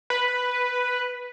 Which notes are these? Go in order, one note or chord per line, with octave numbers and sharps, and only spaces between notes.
B4